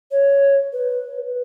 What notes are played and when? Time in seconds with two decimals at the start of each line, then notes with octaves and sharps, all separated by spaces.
0.11 C#5
0.73 B4